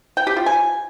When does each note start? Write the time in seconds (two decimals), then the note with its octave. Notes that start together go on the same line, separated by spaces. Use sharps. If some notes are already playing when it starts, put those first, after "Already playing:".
0.17 G5
0.27 G4
0.37 F4
0.46 G#5